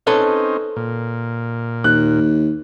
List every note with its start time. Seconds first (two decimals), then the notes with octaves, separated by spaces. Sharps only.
0.07 C4 C#4 D#4 A4 B4 C#5
0.76 A#2
1.84 D#2 F#6